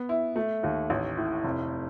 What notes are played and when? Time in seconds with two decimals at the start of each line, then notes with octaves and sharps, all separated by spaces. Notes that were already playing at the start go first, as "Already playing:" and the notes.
Already playing: B3
0.09 E4
0.36 A3
0.63 D#2
0.90 A1
1.17 A2
1.44 F1